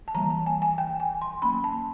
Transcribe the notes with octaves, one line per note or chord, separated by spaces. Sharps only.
A5
E3 G3 A#3 A#5
A5
G#5
G#5
G5
G#5
C6
F#3 A#3 C#4 B5
A5